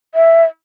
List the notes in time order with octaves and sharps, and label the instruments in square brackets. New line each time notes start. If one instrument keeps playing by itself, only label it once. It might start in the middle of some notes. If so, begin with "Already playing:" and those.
[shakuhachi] E5